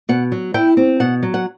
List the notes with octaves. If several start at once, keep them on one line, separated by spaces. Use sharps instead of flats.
B2 F#5
F#3
E4 G5
C4
B2 F#5
F#3
F#5